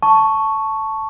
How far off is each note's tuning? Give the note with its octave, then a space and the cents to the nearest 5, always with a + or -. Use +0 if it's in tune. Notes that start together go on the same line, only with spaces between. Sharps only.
A5 +0 C#6 +0